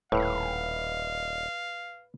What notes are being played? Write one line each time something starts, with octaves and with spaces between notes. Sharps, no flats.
D#1 A2 B4 F5